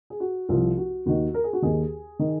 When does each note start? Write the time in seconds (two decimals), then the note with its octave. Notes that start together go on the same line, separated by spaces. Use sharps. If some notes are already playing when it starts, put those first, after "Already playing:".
0.10 G#4
0.20 F#4
0.49 C2 C3 F3 F4
0.77 F#4
1.06 D#2 D#3 F#4
1.34 A#4
1.44 G#4
1.53 F#4
1.62 D#2 D#3 G#4
2.19 D#3